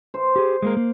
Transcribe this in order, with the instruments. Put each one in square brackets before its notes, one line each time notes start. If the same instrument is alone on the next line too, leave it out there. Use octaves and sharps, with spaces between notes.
[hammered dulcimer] C5
[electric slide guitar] G4 G#4
G#3 A#3 A#4
A#3